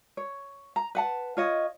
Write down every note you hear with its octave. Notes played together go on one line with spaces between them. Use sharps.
C#5
A#5
B4 F#5 A5
F4 C#5 D#5